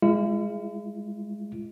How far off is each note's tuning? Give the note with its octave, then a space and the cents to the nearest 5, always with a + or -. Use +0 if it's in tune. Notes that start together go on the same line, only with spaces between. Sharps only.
G#3 +0 E4 +45